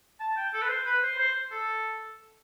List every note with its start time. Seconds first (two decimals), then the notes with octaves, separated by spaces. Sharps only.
0.20 A5
0.37 G5
0.54 A4
0.62 B4
0.69 C5
0.86 B4
1.02 C5
1.19 C5
1.51 A4